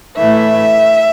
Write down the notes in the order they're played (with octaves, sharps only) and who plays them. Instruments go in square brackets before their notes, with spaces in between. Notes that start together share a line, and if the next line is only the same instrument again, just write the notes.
[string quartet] A2 E3 A3 E5